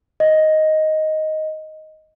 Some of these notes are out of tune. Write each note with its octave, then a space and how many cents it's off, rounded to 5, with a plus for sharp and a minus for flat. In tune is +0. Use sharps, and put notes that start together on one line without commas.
D#5 +5